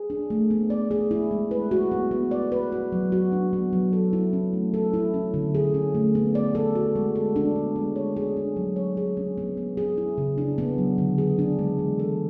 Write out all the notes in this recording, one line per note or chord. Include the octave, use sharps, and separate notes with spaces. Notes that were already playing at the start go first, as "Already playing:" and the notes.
Already playing: G#4
D4
A3
B3
D5
G#4
E4
G#3
B4
F#4
B3
B3
D5
B4
F#4
F#3
F#4
D4
B3
F#3
A4
E4
C#4
A3
A4
E4
C#4
D3
G#4
C#4
A3
B3
D5
A4
F#4
G#3
A4
D4
B3
G#3
C#5
G#4
D4
F#3
C#5
G#4
C#4
B3
B3
G#4
E4
C#3
D4
B3
F#3
D3
G#4
D4
G#3
E3
A4